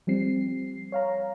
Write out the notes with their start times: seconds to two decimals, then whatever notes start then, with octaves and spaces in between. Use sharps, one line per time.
0.07 F3 G3 C4 C7
0.92 C#5 F5 A#5